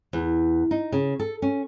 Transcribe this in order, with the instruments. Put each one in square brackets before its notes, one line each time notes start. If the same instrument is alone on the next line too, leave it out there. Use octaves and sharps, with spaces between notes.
[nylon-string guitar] E2
D#4
C#3
A4
C#4